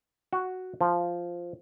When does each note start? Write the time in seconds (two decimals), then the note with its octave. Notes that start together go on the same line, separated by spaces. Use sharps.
0.33 F#4
0.81 F3